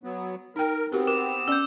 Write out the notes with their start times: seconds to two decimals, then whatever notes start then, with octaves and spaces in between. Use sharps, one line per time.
0.04 F#3 B3
0.56 D#4 A#4 G5
0.92 B3 C4 F#4 G4 A#4
1.07 A#4 D6 E7
1.48 C#4 D5 E6 G6